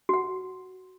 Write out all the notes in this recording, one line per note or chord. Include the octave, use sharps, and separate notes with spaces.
F#4 F#5